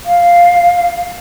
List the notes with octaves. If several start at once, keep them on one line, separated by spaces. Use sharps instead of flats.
F5